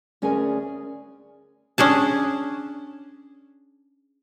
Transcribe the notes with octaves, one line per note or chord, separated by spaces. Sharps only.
D2 C#4 G#4 A#4 D5 G#5
C#4 D4 G#4 A5